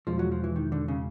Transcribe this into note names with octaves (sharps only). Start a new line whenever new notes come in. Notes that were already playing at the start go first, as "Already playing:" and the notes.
E2 B2 F3 G#3
F#3
F3
E3
D#3
D3
C#3